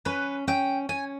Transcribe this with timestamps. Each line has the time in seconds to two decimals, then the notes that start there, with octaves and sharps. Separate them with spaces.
0.05 C#4 B4
0.47 C#4 G5
0.89 C#4 G#5